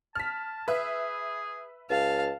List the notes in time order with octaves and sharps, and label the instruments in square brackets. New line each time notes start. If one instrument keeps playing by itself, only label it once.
[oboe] A5 [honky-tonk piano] F6 B6
[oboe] G#4 [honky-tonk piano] B4 E5
[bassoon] C#2 [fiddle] F5 [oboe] A5